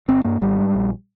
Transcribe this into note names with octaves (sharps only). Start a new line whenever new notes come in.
G1 C4
G2 A#3
G#1 G3
G#2
A#1